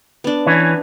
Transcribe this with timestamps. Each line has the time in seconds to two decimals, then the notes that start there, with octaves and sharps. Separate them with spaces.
0.24 B3 D4
0.47 E3 C#4